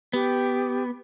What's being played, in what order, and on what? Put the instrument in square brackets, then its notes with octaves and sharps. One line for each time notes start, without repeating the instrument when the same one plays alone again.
[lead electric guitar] B3 [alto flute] G4